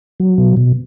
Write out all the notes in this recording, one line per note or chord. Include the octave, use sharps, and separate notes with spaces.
F#3
B2
B2